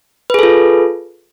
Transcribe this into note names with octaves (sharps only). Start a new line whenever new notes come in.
F4 G#4 A4 B4